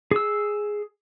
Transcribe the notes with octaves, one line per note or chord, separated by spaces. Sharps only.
G#4 E6